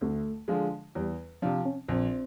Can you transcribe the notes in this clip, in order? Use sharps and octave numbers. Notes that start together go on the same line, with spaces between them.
D2 A3
D3 F3 G#3
E2 G3
C3 F3 D4
C#4
A#1 C4